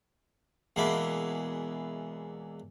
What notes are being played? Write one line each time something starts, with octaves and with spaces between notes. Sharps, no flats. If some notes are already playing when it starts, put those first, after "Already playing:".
E2 B2 G#3 A#3 E4